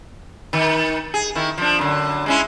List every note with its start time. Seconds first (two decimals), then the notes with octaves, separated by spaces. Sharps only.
0.53 D#3
1.14 G#4
1.35 D#3 E4
1.58 F3 D4
1.79 F#2 D3
2.26 G#3 C#4 E4